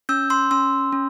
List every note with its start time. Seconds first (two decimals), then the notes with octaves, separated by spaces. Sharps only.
0.09 C#4 E6 G6
0.30 C6 E6
0.51 C#4 C6 E6
0.93 C#4